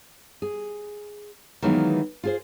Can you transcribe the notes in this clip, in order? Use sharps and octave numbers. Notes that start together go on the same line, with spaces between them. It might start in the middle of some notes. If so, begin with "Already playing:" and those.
G#4
D#3 E3 F#3 G#3 A#3 B3
F4 G#4 C5